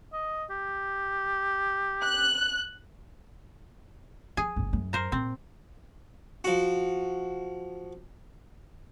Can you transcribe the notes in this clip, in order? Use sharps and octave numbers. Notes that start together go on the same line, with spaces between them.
D#5
G4
F#6
F3 G#4
G1 C#3
F#2
A#4 C5 A#5
A#2 C4
F3 F#4